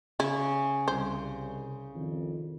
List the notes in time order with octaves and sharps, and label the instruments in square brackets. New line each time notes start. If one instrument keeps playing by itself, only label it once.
[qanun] C#3 [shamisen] E4
[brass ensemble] C2 [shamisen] C5
[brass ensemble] C2 F2 D#3